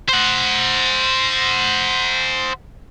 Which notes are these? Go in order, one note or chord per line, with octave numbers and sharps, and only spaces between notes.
C5 F#5